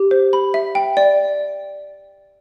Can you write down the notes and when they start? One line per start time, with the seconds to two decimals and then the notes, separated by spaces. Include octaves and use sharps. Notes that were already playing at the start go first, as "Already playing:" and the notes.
Already playing: G4
0.11 C5
0.33 B5
0.54 E5
0.75 G5
0.97 D5